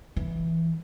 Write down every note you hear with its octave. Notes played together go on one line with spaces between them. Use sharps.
E3